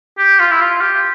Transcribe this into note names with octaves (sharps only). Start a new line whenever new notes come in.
G4
F4
E4
F4
G4